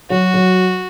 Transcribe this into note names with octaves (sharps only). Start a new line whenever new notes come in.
F#3 F#4
F#3